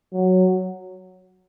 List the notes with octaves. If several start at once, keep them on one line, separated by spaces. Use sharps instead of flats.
F#3